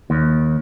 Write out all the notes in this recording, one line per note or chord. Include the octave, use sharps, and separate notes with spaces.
D#2